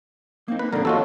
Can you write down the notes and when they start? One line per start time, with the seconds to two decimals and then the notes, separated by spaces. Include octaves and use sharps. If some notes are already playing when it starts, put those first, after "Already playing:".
0.48 A#3 C4 D#4
0.59 B4
0.73 A#1 D3 G#3 A#3 C4 A#4
0.85 E3 F4 F#4 A4 C#5 D#5